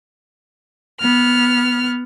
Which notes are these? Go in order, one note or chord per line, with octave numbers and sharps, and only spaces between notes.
B3 F6